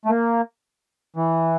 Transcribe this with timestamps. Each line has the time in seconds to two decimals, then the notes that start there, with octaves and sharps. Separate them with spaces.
0.05 A3
0.10 A#3
1.16 E3